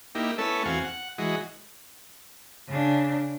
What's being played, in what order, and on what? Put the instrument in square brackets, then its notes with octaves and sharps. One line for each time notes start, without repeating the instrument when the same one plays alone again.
[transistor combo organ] A#3 D#4 E4 G4
A3 B3 C#4 E4 A4
E2 C4 F#4 F5 G#5
F#5
E3 G#3 F#4 D#5
[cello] C#3 D4